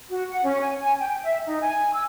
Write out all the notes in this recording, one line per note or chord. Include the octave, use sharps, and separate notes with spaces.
F#4
F#5
C#4
G#5
G#5
G5
E5
D#4
G#5
E6